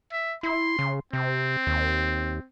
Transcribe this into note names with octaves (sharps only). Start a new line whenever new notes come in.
E5
E4 C6
C#3
C3 C4
D#2